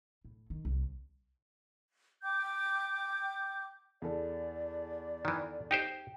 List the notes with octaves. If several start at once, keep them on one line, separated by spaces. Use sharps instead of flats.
A2
D#3
C2
G5 D6 G6
E2 A4 D5
D#3 E3
D#4 G4 C5 G5